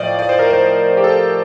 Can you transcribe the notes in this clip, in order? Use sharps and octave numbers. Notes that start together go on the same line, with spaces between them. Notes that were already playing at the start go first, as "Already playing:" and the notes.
Already playing: A2 F3 D5 D#5 F5 G5
D5
C5
A#4
C5
G4
A4